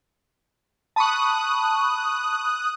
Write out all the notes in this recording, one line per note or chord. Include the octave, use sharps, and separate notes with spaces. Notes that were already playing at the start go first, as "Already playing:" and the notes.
A5 B5 C#6 D#6 F#6